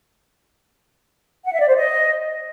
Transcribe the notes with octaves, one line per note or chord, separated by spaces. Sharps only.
F#5
E5
D5
C5
D#5